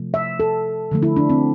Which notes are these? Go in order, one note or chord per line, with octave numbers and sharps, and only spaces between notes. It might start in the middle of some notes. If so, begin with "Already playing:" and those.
Already playing: C3 F3 A3
E5
A4
D3 F3 A3
E4
D4
C4